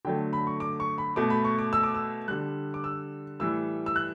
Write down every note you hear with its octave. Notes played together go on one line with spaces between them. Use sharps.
D3 F#3 A3 G5
B5
C#6
D6
C#6
B5
B2 A3 D6
B5
C#6
D6
E6
D6
E6
D3 G3 F#6
D6
E6
A2 E3 G3 E6
E6
F#6